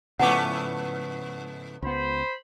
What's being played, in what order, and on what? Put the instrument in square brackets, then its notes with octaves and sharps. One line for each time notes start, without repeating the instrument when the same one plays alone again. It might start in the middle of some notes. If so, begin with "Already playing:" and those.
[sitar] G#2 A3 B3 [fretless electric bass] C#3 F3 [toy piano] F#5 G#5 D6
[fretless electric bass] C#2 B3 [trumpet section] C5 B5